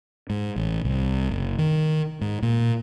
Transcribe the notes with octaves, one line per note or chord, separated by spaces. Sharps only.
G#2
A1
C2
F#1
D#3
G#2
A#2